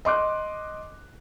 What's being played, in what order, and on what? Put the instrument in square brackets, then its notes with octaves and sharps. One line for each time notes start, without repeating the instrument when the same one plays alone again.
[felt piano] D#5 C6 D6 F#6